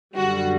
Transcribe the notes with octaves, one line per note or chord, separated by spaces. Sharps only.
F#2 D3 G3 F#4